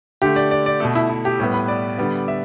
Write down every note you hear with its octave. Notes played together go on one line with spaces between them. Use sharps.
D3 A3 G4
D5
D5
D5
B2 A3 A4
E4
E4
G4
A2 G3 B3
B4
D5
D3 G3 B3
E5